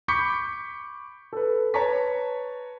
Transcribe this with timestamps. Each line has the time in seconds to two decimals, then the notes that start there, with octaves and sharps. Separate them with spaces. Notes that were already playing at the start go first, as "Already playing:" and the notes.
0.08 B5 C#6 D6 G6 B6 C#7
1.33 A4 B4
1.74 B4 C#5 A5 A#5 C#6 B6